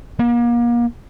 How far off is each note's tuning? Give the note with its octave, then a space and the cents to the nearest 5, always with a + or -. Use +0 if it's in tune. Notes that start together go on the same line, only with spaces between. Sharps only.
A#3 +35